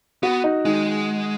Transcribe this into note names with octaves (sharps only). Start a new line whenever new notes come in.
B3 F#4
D#4
D#3 G#3